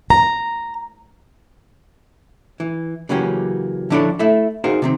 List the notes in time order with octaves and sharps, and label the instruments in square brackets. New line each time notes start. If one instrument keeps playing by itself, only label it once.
[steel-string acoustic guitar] A#5
[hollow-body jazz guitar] E3
C#3 E3 F#3 A#3 C#4 G4
D3 F3 D4 E4 A4 C#5
A3 E4 E5
D#4 F#4 G#4 A#4 C5 F5
C3 D#3 C4